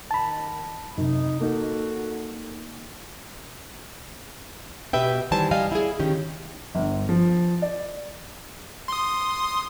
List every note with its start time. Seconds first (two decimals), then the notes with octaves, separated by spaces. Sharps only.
0.11 D#3 A5 B5
0.98 F#2 C3 D#4
1.41 A#3 D#4 F#4 A4
4.93 B2 G4 B4 E5 G5
5.31 D#3 E3 G3 C5 G#5 A5
5.51 G3 D#5 F5 G#5
5.72 E4 G#4
6.00 D#3 C#4 G4
6.75 G1
7.09 F3
7.62 D5
8.88 C6 D#6